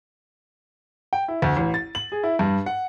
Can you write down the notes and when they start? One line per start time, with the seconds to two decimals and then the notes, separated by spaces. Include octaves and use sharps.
1.13 G5
1.28 E4
1.42 D2
1.56 A1
1.74 A6
1.95 F#7
2.12 G#4
2.24 E4
2.39 G2
2.66 F#5